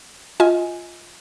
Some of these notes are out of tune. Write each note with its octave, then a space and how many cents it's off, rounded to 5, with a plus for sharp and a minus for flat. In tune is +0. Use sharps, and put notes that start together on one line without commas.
F4 +0 D#5 +25 G#5 +0